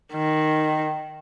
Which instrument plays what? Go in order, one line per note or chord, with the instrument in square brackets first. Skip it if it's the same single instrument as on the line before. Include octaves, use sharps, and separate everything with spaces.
[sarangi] D#3